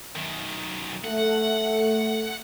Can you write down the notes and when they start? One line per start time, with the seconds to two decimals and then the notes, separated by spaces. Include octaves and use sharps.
0.16 F#2 D#3
1.05 A3 F#5